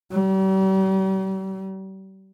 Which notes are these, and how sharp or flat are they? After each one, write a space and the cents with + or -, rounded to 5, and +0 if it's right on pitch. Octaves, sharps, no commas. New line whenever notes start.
G3 -40